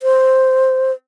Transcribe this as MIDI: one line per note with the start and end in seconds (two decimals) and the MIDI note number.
0.03 0.92 72